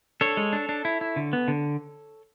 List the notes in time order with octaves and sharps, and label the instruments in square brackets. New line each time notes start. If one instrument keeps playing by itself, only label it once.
[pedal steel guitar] D4 A4 C#5
G#3
D4
D4
E4
E4
D3
B3
D3